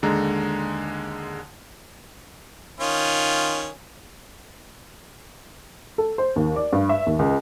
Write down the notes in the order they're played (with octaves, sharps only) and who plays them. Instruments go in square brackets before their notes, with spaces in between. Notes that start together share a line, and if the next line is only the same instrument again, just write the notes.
[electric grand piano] D#2 D3 G#3 A#5
[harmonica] D#3 C#4 F4
[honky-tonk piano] A4
C5
D#2
D5
G2
E5
D#2
C#2